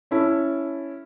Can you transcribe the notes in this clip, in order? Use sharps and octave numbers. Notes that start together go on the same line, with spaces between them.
C#4 E4 A4